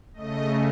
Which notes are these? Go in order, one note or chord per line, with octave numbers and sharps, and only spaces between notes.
C#3 A3 D#5